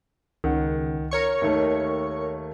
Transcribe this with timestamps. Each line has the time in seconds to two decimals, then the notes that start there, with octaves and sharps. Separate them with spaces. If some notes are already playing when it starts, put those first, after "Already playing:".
0.44 C#2 D#3 F#5
1.11 A#4 C#5 C#6
1.42 D#2 D#3 A3